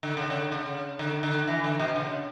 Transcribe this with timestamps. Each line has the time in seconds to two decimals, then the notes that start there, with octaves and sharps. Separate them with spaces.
0.03 D3
0.17 C#3
0.30 D3
0.52 C#3
0.99 D3
1.23 D3
1.48 E3
1.64 D3
1.80 B2
1.96 C#3